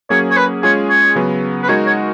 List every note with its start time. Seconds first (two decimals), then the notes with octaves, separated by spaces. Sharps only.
0.10 F#3 A#3 C#4 G#4 C#5
0.30 C#5
0.37 B4
0.63 G#3 C#4 F4 G#4 C#5
0.89 C#5
1.15 C#3 F#3 B3
1.63 B4
1.69 G#3 D#4 F#4 A#4 C#5
1.86 C#5